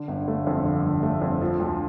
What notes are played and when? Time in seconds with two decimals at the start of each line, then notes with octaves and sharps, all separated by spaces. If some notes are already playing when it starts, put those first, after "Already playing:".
Already playing: D3
0.08 G1
0.28 A3
0.47 F2
0.65 D3
0.84 G1
1.03 A3
1.22 F2
1.41 F3
1.60 D2